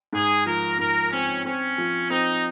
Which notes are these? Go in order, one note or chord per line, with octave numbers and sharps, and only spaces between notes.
G#2 G#4
F3 A#4
G#2 A#4
C4 C#4
C4 C#4
F3
C4 D#4